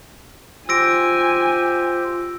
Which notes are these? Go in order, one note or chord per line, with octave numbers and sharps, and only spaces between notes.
F4 G4 C5 G#5 E6 A#6 D7